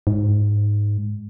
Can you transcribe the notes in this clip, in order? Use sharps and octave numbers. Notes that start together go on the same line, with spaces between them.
G#2